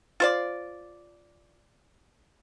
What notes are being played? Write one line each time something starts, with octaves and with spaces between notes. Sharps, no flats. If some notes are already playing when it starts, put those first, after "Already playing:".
F4 C5 D5